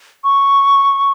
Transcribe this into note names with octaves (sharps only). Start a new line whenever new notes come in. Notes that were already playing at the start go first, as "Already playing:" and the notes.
C#6